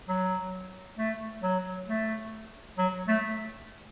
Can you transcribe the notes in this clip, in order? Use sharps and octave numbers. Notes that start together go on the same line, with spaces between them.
F#3
A3
F#3
A3
F#3
A3